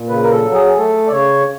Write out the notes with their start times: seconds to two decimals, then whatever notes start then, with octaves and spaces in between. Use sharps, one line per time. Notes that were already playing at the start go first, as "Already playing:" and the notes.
Already playing: A#2
0.08 C#3 B4
0.23 A#4
0.32 A4
0.42 F#3
0.54 G#4
0.77 A3 A4
1.07 D5
1.11 C#3 C#5